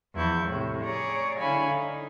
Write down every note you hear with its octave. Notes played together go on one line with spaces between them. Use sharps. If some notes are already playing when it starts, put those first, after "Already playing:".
E2 F3 E4 C#6 G6
A2 C3
G#4 C#5 D5 A#5
D3 E4 C#5 F5 G#5 B5
D#4